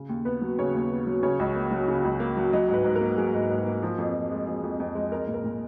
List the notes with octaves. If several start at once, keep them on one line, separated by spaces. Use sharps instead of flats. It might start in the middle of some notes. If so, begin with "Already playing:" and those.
Already playing: C#3
D#2
B3 B4
F#3
C#3 C#5
D#2
B3
F#3
C#3 C#5
C#2
A#3
F#3
C#3
C#2
A#3
F#3
F#3 D#5
G#2
B4
G#2
A#4
A#3
F#3 G#4
G#2
G#2
A#3
F3
F2
F2
G#3
F3 G#4
F2
F2
G#3
G#3 A#4
A#2
A#4
A#2